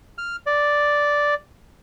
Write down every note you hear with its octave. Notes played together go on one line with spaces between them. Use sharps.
F6
D5